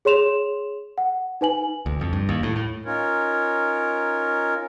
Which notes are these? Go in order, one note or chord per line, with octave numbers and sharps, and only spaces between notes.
G#4 C#5 C6 E7 F7
F#5
D#4 B4 G#5 F#7
D2
F2
G2
D#2
A2
A2
C#4 D#4 F4 A#4 C#5